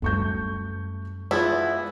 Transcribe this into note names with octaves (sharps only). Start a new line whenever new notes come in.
F#2 G3 A3 C#6 G6
E3 G#3 B3 E4 F4 E5